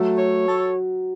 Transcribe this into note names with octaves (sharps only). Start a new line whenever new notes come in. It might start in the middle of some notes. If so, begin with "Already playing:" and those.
Already playing: F#3 A3
C#5
A4